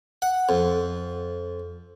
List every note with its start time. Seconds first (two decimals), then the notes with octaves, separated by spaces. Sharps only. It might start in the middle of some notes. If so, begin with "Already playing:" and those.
0.22 F#5
0.49 F2